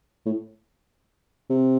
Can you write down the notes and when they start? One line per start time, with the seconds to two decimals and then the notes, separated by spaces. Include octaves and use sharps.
0.26 A2
1.50 C3